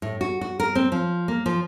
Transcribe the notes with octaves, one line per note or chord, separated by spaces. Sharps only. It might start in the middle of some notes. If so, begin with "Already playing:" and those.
A2
F#4
F#4
A#4
C4
F3
A#3
F3